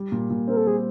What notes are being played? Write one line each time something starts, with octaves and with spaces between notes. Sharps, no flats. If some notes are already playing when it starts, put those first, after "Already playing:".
Already playing: G3
A#2
A#2
C4 A#4
A4
G3 G#4